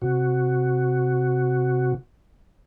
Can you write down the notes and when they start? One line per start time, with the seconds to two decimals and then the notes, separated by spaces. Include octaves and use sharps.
0.02 C3 F#4